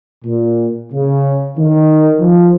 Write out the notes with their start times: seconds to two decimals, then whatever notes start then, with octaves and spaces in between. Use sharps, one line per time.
0.25 A#2
0.93 C#3
1.58 D#3
2.20 F3